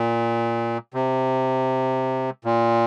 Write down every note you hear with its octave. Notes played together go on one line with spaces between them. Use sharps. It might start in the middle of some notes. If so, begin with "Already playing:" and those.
Already playing: A#2
C3
A#2